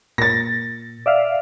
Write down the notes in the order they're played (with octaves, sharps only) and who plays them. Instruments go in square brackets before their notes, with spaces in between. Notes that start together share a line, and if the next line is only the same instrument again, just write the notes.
[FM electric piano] A#2 [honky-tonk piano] A6 A#6
[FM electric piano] D5 E5 F5